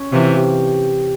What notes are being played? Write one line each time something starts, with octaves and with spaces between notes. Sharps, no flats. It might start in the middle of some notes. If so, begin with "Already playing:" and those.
Already playing: C#4
C3 E3 F4
G4